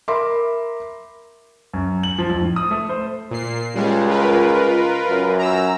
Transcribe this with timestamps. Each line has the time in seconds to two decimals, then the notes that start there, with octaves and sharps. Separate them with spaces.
0.08 A#4 E5 B5 C6 D6
1.73 F#2
2.03 F#7
2.18 F3
2.30 F2
2.41 A2
2.56 D#6
2.71 A3
2.89 C5
3.31 A#2 C7
3.75 C#2 G3 G#3
4.07 F4 A#4 B4
5.08 F#2
5.39 A#5 E6